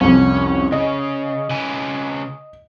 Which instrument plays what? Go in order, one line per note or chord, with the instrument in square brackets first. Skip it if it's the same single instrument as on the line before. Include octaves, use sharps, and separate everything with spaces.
[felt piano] C2 F2 [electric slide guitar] C#4
[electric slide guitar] C#3 [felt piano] D#5
[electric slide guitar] C#3 B4 G#5